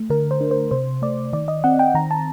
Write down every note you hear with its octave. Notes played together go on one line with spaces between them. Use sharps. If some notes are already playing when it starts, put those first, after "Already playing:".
Already playing: A3
D3 A#4
C5
D4
C5
C3 C5
A3 D5
D#3 D5
D#5
C4 F#5
G5
D#3 A#5
A5